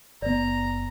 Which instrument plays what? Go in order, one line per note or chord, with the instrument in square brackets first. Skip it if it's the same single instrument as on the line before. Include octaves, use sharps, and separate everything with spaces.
[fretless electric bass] F#1 B3 [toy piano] D5 [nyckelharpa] A#5